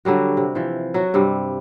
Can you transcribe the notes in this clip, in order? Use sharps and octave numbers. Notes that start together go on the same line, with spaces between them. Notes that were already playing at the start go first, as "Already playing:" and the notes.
D3 F#3 G3 F#4
C3
E3 F3
F#3 F#4
G2 C3 G3